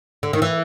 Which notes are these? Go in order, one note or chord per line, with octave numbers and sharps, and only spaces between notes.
D3
D#3
E3